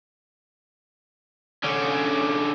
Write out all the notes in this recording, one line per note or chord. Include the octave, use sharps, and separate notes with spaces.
D3 C#4